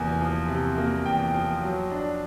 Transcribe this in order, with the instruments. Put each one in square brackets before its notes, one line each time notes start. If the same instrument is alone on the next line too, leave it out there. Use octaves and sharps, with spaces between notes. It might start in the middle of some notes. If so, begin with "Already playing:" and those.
Already playing: [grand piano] E2 C3 A#3 G#5
F3
C3
A#3
E2 G5
F3
F#3
D4